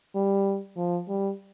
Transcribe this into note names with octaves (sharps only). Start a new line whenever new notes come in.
G3
F3
G3